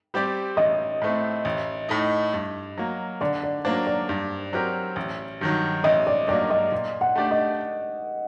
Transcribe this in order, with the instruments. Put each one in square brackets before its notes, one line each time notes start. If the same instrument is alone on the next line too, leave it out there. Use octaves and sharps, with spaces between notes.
[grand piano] G3 C4 G4 D5
[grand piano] A1 [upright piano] D#5
[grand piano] A2 A3 C4
A1
A2 A3 D#4
G2
F#3 A#3
[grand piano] D3 [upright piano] D5
[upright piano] D5
[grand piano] F#3 A#3 D4 [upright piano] C5
[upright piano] D5
[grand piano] G2
F#3 C4 G4 A#4
A1
G2 D#3 F#3
[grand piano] A1 [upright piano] D#5
[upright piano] D5
[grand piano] G2 F#3 A#3 [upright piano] D5
[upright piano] D#5
[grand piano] A#2
[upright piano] F#5
[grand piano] A3 D4 G4 D5
[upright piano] D#5